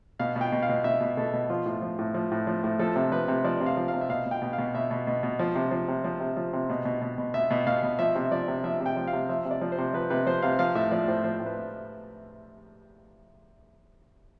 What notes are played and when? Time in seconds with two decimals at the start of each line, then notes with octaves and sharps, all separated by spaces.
0.19 B2 F5
0.36 B2
0.41 G5
0.52 B2
0.62 F5
0.69 B2
0.84 B2 E5
1.00 B2
1.17 B2 A4
1.33 B2
1.49 F3 F4
1.66 A2
1.82 F3
1.99 A2
2.14 F3
2.31 A2
2.47 F3
2.64 A2
2.79 F3 A4
2.96 C3
3.12 F3 B4
3.28 C3
3.44 F3 D5
3.61 C3
3.66 F5
3.77 F3
3.88 F5
3.93 C3
4.01 E5
4.09 B2 F5
4.26 B2
4.31 G5
4.42 B2
4.53 F5
4.58 B2
4.75 B2 E5
4.91 B2
5.07 B2
5.23 B2
5.39 F3
5.55 C3
5.71 F3
5.88 C3
6.04 F3
6.20 C3
6.37 F3
6.53 C3
6.69 B2
6.85 B2
7.01 B2
7.18 B2
7.34 B2 E5
7.51 B2
7.67 B2 F5
7.83 B2
7.99 F3 E5
8.15 C3
8.31 F3 D5
8.48 C3
8.64 F3 E5
8.80 C3
8.86 G5
8.97 F3
9.07 F5
9.13 C3
9.29 F3 E5
9.45 C3
9.51 D5
9.61 F3
9.72 C5
9.78 C3
9.93 F3 B4
10.10 C3 B4
10.26 F3 C5
10.42 C3 F5
10.59 F3 F5
10.75 A2 E5
10.91 F3 D5
11.08 A2 C5
11.24 F3 C5
11.40 A2
11.46 B4